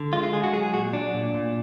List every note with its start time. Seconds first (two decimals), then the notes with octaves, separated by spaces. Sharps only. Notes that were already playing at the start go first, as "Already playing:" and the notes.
Already playing: D3
0.13 G#3 F4
0.23 F4
0.33 G#3 G#4
0.44 F#4
0.53 F#3 G#4
0.63 G#4
0.74 A#2 F#4
0.93 F#3 D4
1.14 A#2
1.34 A#2